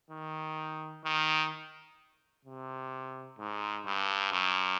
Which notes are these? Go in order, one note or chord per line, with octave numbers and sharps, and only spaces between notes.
D#3
D#3
C3
G#2
G2
F#2